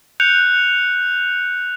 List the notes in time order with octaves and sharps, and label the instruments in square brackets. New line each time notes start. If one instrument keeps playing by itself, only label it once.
[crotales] F#6 G6 C#7 F7